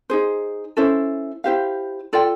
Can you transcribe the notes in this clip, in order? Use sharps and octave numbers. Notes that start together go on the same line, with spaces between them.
D#4 G#4 C5
C#4 E4 A4 C5
E4 G4 C5 F5
F4 A4 D5 G5